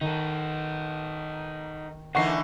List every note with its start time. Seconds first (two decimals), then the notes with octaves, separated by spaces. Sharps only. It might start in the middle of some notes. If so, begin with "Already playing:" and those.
0.01 D#3 D#4 A4
2.15 F#2 D3 E3 A#3 D#4 F#5 C#6 C7